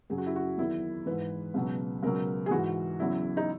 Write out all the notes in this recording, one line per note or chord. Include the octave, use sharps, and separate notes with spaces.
F#2 C#3 F#3 G#4
F#4
E4
F#4
E2 D#3 F#3 E4
G#2 E3 B4
C#2 B2 F#3
C#2 B2 F#3 A#4
G#4
G#2 E3 F#4
E2 C#3 F#3 E4
D#4